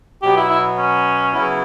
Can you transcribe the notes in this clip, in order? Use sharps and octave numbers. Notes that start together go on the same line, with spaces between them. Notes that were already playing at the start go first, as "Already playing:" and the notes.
B2 F#3 B3 G4
E4
E4
C#4
C#3 F#3 B3 E4